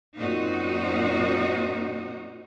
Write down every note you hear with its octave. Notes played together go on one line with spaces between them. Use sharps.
F#2 A#2 C4 D#4 F#4